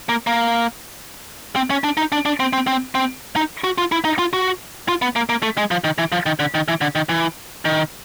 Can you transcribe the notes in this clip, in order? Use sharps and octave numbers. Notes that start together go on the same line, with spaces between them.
A#3
A#3
C4
C#4
D4
D#4
D4
D4
C4
C4
C4
C4
D#4
F#4
F4
E4
D#4
F4
F#4
F4
B3
A#3
A#3
A3
G#3
F3
D#3
E3
F3
D#3
D3
D#3
E3
D3
D#3
E3
D#3